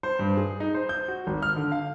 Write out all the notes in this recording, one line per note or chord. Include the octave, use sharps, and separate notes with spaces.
C5
G2
G#4
D#4
C5
G6
F#4
G#1
F6
D3
F5